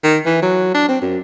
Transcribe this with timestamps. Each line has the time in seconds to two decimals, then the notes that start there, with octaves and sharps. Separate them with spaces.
0.04 D#3
0.26 E3
0.42 F#3
0.74 D4
0.89 C4
1.02 F#2